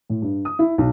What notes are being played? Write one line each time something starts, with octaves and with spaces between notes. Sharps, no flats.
A2
G2
D#6
E4
B1